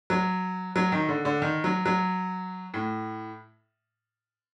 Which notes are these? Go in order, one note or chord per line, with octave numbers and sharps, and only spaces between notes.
F#3
F#3
D#3
D3
D3
D#3
F#3
F#3
A2